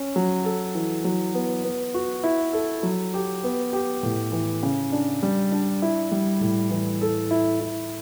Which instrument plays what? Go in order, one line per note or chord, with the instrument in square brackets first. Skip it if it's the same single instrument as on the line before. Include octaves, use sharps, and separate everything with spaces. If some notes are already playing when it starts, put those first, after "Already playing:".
Already playing: [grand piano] C#4
F#3
A4
E3
F#3
B3
B3
F#4
E4
A4
F#3
G4
B3
G4
A2
E3
C#3
D4
G3
D4
E4
G3
A2
E3
A4
E4
E4